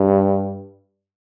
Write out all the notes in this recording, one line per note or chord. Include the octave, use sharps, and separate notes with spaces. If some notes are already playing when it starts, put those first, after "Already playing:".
Already playing: G2